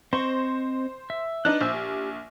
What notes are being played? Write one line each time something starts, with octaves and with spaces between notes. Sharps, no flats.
C4 C5 D#5 C#6
E5
D4 D#4 B4 F#6
A#1 C5 E5 E6
G4